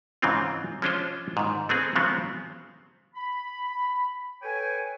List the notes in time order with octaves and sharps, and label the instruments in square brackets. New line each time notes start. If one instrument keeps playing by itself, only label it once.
[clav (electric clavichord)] G#2 C#3 E3 C4 C#4 F4
F3 G#3 C#4 D4 F4 C5
G#2 D#3
A3 B3 C4 G#4
C#3 F3 F#3 G#3 B3 C4
[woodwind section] B5
A4 B4 C#5 G5 G#5